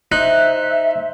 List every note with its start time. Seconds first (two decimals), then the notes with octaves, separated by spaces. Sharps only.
0.12 D#4 C5 E5 F#6